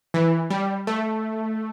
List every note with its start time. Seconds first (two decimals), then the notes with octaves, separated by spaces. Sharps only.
0.14 E3
0.50 G3
0.87 A3